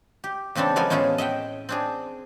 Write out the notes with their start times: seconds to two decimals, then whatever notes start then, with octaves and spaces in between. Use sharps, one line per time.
0.24 G4
0.55 E2 C#3 C4 D4 A4
0.76 F3 G#3 B3 A4 A#4 G#5
0.90 E2 A2 C#4 F4 G#4 A4
1.18 D#5 E5 F#5 G5
1.69 C4 D4 G#4